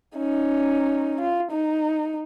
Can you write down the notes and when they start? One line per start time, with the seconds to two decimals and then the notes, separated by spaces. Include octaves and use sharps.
0.18 C#4 D#4
1.21 F4
1.51 D#4